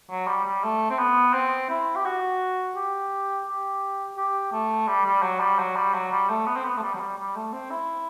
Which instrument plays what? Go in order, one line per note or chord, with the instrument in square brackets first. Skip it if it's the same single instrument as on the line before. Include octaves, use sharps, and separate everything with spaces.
[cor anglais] F#3
G3
G3
A3
C4
B3
C4
E4
G4
F#4
G4
G4
G4
A3
G3
G3
F#3
G3
F#3
G3
F#3
G3
A3
B3
C4
B3
A3
G3
F#3
G3
G3
A3
C4
E4